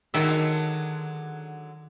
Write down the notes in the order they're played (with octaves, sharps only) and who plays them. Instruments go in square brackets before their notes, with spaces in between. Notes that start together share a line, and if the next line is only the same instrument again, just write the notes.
[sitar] D3 F#3 G#3 [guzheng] D#3 E5